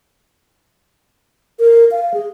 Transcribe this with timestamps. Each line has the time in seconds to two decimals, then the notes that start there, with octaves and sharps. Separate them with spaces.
1.59 A#4
1.91 F5
2.14 G#4